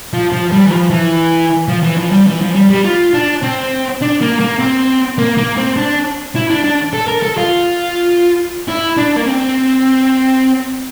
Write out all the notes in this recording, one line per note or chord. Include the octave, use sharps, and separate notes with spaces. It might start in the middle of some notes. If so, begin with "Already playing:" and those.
F3
F3
G3
E3
F3
E3
F3
E3
F3
G3
E3
F3
G3
G3
F4
D4
C4
D4
A#3
A#3
C4
A#3
A#3
C4
D4
E4
D4
D4
A4
A#4
A4
F4
E4
D4
A#3
C4